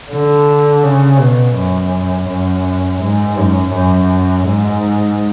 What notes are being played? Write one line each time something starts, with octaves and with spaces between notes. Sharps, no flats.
D3
C#3
B2
F#2
F#2
G#2
F#2
F#2
G#2